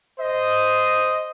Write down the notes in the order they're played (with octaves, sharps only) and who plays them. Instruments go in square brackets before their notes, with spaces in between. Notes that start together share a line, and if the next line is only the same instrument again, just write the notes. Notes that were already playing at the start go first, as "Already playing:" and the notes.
[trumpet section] C5 D#5